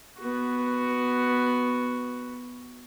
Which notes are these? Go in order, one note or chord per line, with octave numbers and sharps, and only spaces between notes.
B3 F#4